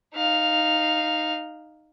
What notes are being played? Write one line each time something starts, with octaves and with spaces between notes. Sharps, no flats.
D#4 F5